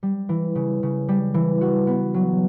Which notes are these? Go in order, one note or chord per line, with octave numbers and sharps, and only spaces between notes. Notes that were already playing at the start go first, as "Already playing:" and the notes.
G3
E3
C#3
C#3
G3
E3
F#4
B3
F#3